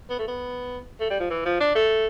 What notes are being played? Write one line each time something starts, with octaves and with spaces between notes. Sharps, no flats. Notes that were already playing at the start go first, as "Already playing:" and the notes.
B3
A3
B3
A3
G3
F3
E3
F3
D4
A3